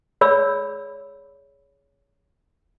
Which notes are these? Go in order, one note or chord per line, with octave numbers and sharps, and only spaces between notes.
G#4 C#5 D5 B5 E6